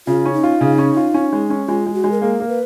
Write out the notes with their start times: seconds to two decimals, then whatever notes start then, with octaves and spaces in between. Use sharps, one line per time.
0.07 C#3 F4
0.25 C#4
0.33 D#4
0.43 F4
0.61 C#3
0.78 C#4
0.97 F4
1.14 C#4
1.33 G#3
1.50 C#4
1.68 G#3 F4
1.86 G#3
1.94 F#4
2.04 G#3
2.12 A#4
2.22 A#3 G#4
2.40 A#3
2.48 B4